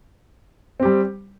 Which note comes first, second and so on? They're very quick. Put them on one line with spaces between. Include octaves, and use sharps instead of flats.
C4 G4 G3